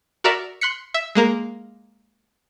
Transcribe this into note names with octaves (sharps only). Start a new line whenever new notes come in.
F#4 A#4 D5 E5 A#5
C6 F#6 B6 C#7
E5
G#3 A#3 A#4